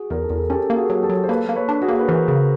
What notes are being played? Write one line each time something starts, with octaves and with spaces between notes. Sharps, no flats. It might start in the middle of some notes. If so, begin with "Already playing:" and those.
Already playing: F#4 G#4
E2 A#4
A4
E2
G#4 A#4
C#4 G4 A4
A#3
F#4 G#4
F#3
G4 A4
F#3
C5
A#3 A4 B4
A#3
B4 C#5
D4
F#4 G#4
A#3
B4
E3 A#4 C5
C#3